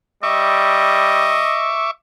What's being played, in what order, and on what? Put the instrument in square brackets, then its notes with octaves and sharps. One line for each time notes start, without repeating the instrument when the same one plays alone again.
[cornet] G3 [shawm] D#5 [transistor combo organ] E5 C#6 D6